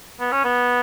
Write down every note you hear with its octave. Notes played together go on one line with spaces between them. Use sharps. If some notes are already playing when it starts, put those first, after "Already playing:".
B3
C#4
B3